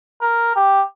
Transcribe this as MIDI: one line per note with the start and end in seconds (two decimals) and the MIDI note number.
0.21 0.52 70
0.56 0.83 67